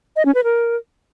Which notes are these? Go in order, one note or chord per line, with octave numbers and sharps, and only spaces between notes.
D#5
C#4
B4
A#4